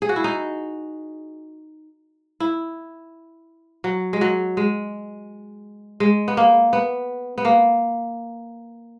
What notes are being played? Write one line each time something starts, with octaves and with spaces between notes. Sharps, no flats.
G#4
F#4
E4
D#4
E4
F#3
G#3
F#3
G#3
G#3
B3
A#3
B3
B3
A#3